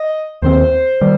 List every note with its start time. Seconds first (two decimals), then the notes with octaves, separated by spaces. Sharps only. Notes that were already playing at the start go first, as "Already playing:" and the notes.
Already playing: D#5
0.42 D#2 D#3 C4 C5
1.01 D#3 G3